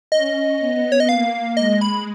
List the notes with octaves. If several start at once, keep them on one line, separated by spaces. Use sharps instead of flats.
C#4 D#5
B3
C#5
D#5
A#3 F5
G#3 D#5
B5